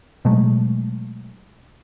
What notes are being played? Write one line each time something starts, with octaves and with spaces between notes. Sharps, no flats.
B2 F#3 G#3 A3